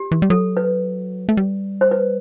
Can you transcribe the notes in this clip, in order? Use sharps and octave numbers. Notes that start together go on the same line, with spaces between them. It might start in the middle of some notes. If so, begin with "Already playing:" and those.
Already playing: G4
E3
G3
F#3 A4
B4
A3
G3
C5
B4